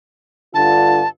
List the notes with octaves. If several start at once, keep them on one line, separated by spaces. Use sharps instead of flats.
G2 D3 F4 A5